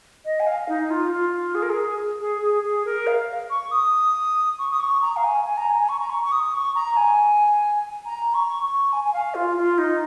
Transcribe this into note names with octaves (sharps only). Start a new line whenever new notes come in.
D#5
G#5
F5
D#4
F4
F4
G#4
A#4
G#4
G#4
G#4
G#4
A#4
F5
C#6
D#6
C#6
D#6
C#6
A#5
F5
G#5
G#5
A#5
G#5
C#6
A#5
C#6
C#6
D#6
C#6
A#5
G#5
A#5
C#6
C#6
G#5
G#5
F5
F4
F4
D#4